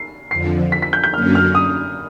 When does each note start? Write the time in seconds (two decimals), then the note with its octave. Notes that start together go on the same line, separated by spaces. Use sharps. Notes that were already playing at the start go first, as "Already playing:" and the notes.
Already playing: C7
0.31 F2 D3 F3 C7
0.72 B6
0.82 B6
0.93 G6
1.04 G6
1.14 F#2 D3 F#3 A#3 C#4 F6
1.35 F6
1.55 D#6